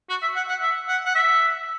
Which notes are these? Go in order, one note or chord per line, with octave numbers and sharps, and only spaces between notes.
F#4
E5
F#5
F#5
E5
F#5
F#5
E5